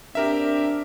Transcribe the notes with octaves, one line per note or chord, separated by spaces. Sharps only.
C4 D4 G4 A#4 E5